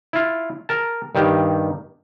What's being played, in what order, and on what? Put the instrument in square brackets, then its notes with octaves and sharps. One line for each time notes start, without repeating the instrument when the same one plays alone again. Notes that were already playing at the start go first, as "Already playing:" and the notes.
[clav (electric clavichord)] E4 F4
A#4 A5
G2 D#3 G4